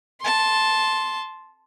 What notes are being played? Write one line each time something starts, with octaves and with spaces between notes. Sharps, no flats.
A5 C6